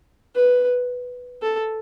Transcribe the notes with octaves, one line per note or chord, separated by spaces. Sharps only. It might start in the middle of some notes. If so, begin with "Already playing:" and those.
B4
A4